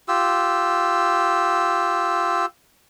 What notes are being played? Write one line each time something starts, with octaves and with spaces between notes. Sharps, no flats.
F4 G4 E6